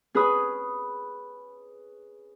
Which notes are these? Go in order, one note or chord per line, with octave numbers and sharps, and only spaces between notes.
C#4 G#4 B4 B5 D#6